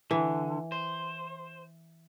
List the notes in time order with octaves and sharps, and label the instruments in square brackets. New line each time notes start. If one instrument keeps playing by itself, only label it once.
[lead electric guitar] D3 [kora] E3
[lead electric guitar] C5